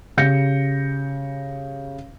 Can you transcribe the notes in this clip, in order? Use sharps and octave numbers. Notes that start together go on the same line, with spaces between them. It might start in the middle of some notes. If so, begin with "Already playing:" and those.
C#3 G4 G6 A#6 C#7